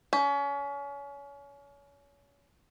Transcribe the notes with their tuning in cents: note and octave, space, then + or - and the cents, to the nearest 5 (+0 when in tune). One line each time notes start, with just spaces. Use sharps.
C#4 +30